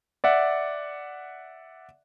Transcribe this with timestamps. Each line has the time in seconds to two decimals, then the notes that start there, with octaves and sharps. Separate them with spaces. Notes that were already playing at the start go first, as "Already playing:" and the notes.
0.24 D5 E5 F#5